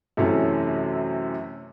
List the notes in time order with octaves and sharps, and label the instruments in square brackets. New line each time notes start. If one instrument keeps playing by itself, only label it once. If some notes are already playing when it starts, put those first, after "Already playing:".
[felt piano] F#2 C3 E3 A3 C#4